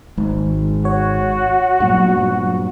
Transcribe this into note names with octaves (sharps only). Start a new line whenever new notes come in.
G#1 G#2
F#4 C#5
G2 A#2 F#3